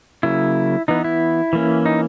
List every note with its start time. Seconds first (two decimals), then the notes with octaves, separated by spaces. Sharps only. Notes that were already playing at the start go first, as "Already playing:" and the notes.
0.23 C#3 F#3 A#3 E4
0.88 E3 B3 D#4
1.04 E4
1.53 E3 A#3 C#4
1.86 D#4